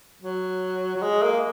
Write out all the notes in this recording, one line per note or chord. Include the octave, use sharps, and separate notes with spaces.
F#3
F#3
G#3
A#3